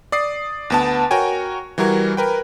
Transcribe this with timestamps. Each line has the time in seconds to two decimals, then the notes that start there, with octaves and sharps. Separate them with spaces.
0.12 D5 D#6 C7
0.70 D2 B3 A5
1.11 F#4 A#4 C#5 G5 G#5
1.78 E3 G3 F#4 A#4 G#6
2.17 A#4 B4 G5